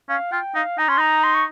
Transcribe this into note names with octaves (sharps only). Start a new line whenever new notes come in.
C#4 F5
F4 G5
D#4 F5
D#4 A#5
C#4 C6
D#4 A#5
C6
C#6